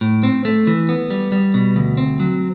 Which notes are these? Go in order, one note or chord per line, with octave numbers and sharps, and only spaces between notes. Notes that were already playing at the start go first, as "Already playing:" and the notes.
A2
C4
A3
E3
B3
G3
G3
B2
D2
C4
F#3